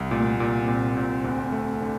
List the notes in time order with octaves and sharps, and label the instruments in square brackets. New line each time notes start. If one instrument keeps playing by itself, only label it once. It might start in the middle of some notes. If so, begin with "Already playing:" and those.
Already playing: [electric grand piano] C2
[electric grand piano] A#2 [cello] A3
[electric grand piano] A#2 [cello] A#3
[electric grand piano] A#2 [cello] C4
[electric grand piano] A#2
D2
A3
D3